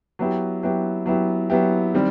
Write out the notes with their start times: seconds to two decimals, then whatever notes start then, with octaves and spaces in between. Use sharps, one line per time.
0.19 F#3 B3 E4 G4
0.63 F#3 B3 E4 G4
1.06 F#3 B3 E4 G4
1.50 F#3 B3 E4 G4
1.94 D#3 G3 C4